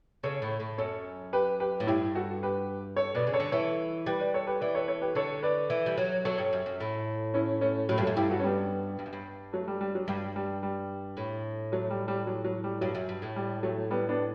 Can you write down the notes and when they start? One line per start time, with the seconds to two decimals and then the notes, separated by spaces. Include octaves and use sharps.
0.23 C#3 A4 C#5
0.42 A2
0.60 A2
0.78 F#2 A4 C#5
1.33 G4 B4
1.60 G4 B4
1.80 A2
1.87 G2 E4 G4
2.15 F#4 A4
2.43 G4 B4
2.96 A4 C#5
3.15 B2 B4 D5
3.27 C#3
3.33 A4 C#5
3.40 D3
3.51 E3 A4 C#5
4.06 G3 G4 B4
4.20 B4 D5
4.34 A4 C#5
4.47 G4 B4
4.61 E3 B4 D5
4.75 A4 C#5
4.88 A4 C#5
5.02 G4 B4
5.15 D3 A4 C#5
5.43 B4 D5
5.70 E3
5.86 G3
5.97 F#3
6.25 F#3 A4 C#5
6.38 G2
6.53 F#2
6.66 F#2
6.80 A2
7.34 C#4 E4
7.61 A3 C#4
7.89 A2 F#3 A3
7.98 G2
8.02 F#2 F#3 A3
8.16 G2 E4 G4
8.30 F#4 A4
8.39 C#4
8.44 G3 B3
8.99 G2
9.06 F#2
9.13 G2
9.53 F#3 A3
9.68 G3
9.81 G3
9.95 F#3
10.08 G2 G3
10.36 G3
10.63 G3
11.17 A2
11.72 F#3 A3
11.90 G3
12.08 G3
12.27 F#3
12.44 F#3
12.64 G3
12.81 G2 F#3
12.95 F#2
13.09 G2
13.22 A2
13.36 G3
13.63 F#3 A3
13.90 G3 B3
14.09 B3 D4